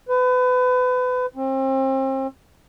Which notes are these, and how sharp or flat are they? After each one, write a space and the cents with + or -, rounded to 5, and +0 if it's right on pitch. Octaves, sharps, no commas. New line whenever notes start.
B4 +30
C4 +35